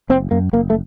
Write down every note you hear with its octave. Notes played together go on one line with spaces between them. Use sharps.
F#1 C4
F#2 A#3
F#1 A#3
A3